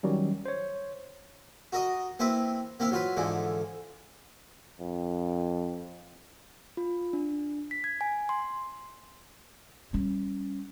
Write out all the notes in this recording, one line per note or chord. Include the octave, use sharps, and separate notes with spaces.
D#3 F#3 G3 C#4
C5 C#5
F#4 A#4 D#5
A#3 C4 E4 B4
A#3 C4 E4 F5
F#3 F4 B4
G#2 D3 E3 F3
F2
F4
D4
B6
G#6
G#5
C6
G3 C#4